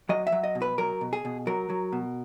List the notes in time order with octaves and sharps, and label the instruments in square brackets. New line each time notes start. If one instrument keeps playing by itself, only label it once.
[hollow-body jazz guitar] F#3 D#5
E5
F#3
D#5
B2
B4
F#3 A#4
B2
G#4
B2
F#3 A#4
F#3
B2